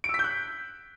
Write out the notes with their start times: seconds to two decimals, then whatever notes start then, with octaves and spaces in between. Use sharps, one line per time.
0.04 D7
0.09 E6
0.14 B6
0.19 G6
0.24 F#6